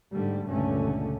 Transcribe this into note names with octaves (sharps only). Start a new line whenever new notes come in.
G#2 D3 G3 A3
C#2 G2 A#2 D3 A3 C#4